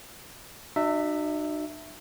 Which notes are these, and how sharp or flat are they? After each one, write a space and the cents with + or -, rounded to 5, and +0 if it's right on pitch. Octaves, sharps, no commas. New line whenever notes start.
D#4 -45 F#4 +0 E5 +0